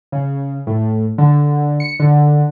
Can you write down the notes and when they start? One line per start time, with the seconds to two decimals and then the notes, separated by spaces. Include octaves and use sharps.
0.12 C#3
0.67 A2
1.18 D3
1.80 C#7
2.00 D3